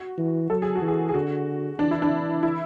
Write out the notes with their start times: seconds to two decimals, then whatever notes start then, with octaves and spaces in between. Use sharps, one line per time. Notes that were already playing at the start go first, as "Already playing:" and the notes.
Already playing: F#4
0.18 E3
0.50 F#3 A4
0.62 G#4
0.75 F#4
0.82 E3
0.88 G#4
1.09 G#4
1.14 D3 F#4
1.79 E3 D4
1.91 E4
2.02 D4
2.43 E4